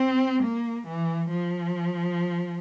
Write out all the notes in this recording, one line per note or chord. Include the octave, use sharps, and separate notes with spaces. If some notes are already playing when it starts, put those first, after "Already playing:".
Already playing: C4
A#3
E3
F3